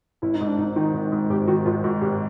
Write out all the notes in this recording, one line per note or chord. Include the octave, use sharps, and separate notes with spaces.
G#1 E4
D#4
G#2
D4
G#1 D#4
D#3 D#4
G#1
G#2
G#1 G4
D#3 F#4
G#1 F4
G#2 F#4
G#1 G4